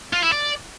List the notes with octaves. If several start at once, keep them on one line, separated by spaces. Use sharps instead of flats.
F4
E4
D5